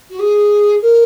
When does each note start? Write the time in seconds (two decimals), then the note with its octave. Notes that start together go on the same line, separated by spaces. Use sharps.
0.10 F#4
0.19 G#4
0.82 A#4